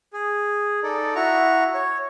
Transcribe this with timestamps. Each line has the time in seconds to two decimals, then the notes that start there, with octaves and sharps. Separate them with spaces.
0.13 G#4
0.83 D#4 A4 D5
1.15 E4 F#4 A#5 C#6
1.74 C#5